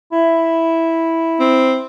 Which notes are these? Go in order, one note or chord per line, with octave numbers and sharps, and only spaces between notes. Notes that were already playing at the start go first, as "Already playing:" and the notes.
E4
C4